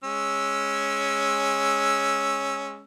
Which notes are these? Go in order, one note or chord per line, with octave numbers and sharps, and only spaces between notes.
G#3 C#4 E6